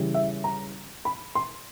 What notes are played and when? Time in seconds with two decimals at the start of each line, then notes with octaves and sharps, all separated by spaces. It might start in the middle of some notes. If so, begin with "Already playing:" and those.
Already playing: C#3 E3 G3
0.15 E5
0.44 A#5
1.05 B5
1.35 C6